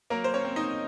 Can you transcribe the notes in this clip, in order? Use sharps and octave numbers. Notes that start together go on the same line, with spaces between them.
F#3 A#3 A#4
C5
C#4 C#5
C4
D#4 D#5